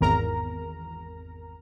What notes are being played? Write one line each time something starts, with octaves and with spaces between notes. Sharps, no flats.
G#1 E2 A#4 A#5